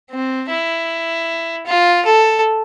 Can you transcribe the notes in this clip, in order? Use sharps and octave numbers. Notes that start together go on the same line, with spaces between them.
C4
E4
F4
A4